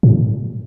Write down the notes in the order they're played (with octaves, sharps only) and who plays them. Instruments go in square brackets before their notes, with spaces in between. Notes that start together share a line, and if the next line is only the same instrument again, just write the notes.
[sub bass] A2